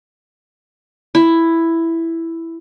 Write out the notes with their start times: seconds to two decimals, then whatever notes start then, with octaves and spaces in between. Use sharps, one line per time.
1.15 E4